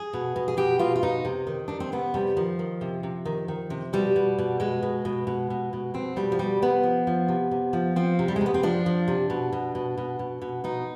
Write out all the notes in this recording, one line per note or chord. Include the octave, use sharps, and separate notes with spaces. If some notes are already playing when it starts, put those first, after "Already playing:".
Already playing: G#4
B2
B2
G#4
B2 G4
B2 F4
F4
B2 D#4
C3
D#3
D#3 D4
C4
C3 B3
C3 G3
D#3 F3
D#3
C3
C3
D#3
D#3
C3
B2 G3
B2
B2
B2 G#3
B2
B2
B2
B2
B2
B2 C4
B2 G3
F3
B2 G3
C3 B3
F3
F3
C3
C3
F3
F3 C4
C3
G3
G#3
C3
B3
C4
F3 D4
F3
C3
B2
B2
B2
B2
B2
B2
B2 D#4